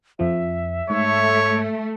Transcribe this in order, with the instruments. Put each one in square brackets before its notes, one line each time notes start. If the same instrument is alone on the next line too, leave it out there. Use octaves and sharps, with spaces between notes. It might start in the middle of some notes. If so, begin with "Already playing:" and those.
[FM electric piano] F2 F3 [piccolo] E5
[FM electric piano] G#2 [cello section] A3 [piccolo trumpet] C#5